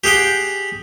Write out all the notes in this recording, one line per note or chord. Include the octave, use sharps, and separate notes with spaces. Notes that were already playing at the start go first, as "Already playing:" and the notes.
G4 G#4 F#5 G5